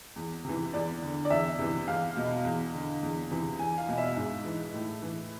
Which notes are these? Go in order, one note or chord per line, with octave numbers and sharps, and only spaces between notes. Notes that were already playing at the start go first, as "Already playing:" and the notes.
E2
C3 E3
E2 D5
D3
D5
E2 E5
C3 E3
E2 F5
B2
E2
D3
E2
C3 E3
E2 G#5
F5
B2
E5
G#2
E3
A2
E3